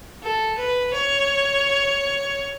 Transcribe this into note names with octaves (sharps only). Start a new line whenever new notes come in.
A4
B4
C#5